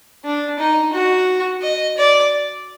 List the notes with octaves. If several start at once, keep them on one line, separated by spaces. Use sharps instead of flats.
D4
D#4
F#4
D#5
D5